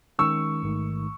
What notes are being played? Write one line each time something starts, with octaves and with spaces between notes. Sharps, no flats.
D#3 G#3 C#4 C#6 E6
A1 G#2 D#3 A3